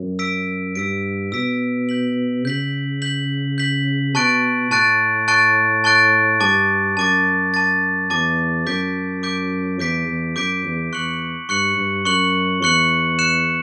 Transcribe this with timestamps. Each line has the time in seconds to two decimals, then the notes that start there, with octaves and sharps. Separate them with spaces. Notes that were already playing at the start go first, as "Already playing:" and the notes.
Already playing: F#2
0.19 E6 B6 D7
0.76 G2 E6 B6 D7
1.32 B2 E6 B6 D7
1.89 G6 B6 F#7
2.45 C#3 G6 B6 F#7
3.02 G6 B6 F#7
3.58 G6 B6 F#7
4.15 B2 A5 C#6 F#6 A6 D7
4.70 A2 A5 C#6 F#6 A6 D7
5.28 A5 C#6 F#6 A6 D7
5.84 A5 C#6 F#6 A6 D7
6.40 G2 A5 D6 A6
6.96 F#2 A5 D6 A6
7.54 A5 D6 A6
8.10 E2 A5 D6 A6
8.66 F#2 D6 G6 B6 D7
9.23 D6 G6 B6 D7
9.79 E2 D6 G6 B6 D7
10.07 E2
10.36 F#2 D6 G6 B6 D7
10.65 E2
10.93 E2 C#6 F#6 C#7 F#7
11.49 G2 C#6 F#6 C#7 F#7
11.77 G2
12.05 F#2 C#6 F#6 C#7 F#7
12.62 E2 C#6 F#6 C#7 F#7
13.19 F#6 C#7 E7